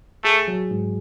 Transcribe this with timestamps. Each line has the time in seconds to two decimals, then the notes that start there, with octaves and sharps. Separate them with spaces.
0.24 A3 G#4
0.48 F#3
0.71 G#2